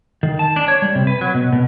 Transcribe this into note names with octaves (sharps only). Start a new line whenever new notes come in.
D#3
A5
D4
C#5
G3
C3
B4
F#3
B2
B2